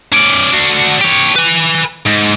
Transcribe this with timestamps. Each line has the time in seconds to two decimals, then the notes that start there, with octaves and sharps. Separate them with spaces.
0.12 C#4 D5
0.52 D4 F#4
1.01 G4 C#5
1.36 B4 G#5
2.06 G#2